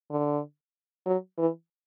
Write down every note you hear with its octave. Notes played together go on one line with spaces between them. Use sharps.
D3
F#3
E3